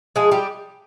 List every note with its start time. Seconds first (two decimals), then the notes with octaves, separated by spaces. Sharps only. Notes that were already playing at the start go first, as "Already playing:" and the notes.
0.16 F3 G#3 G#4
0.31 G3 G4